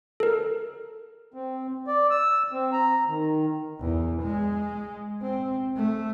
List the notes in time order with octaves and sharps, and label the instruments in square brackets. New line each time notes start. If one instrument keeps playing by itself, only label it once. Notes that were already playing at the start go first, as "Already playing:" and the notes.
[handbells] A4 A#4
[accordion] C4
D5
E6
C4
A#5
D#3
[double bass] E2
G#3
C4
A3